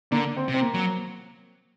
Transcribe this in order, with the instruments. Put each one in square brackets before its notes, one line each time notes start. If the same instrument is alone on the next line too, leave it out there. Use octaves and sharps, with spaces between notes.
[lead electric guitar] D3 [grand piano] A#3 D4
[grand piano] C4
[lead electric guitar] C3
[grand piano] C4
A#3
[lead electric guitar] F#3